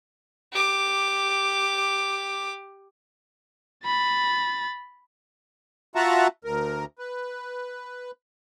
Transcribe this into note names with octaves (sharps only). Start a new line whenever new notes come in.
G4 D6
B5 A6
F4 F#4 E5 F#5 A5 A#5
D2 A#4
B4